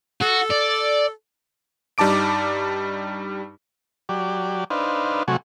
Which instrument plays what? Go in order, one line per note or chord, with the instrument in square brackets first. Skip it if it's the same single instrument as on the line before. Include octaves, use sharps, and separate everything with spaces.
[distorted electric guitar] F#4 [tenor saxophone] A4
[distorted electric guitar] D5
[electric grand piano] G2 G3 D#4 A5 D6 D7
[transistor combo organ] F#3 G4 D5
D4 D#4 B4 C5 F5
C3 F#3 A3 F#4 G#5 C#6